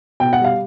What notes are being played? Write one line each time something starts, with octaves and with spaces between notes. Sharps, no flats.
B2 G5
F#5
G3 F5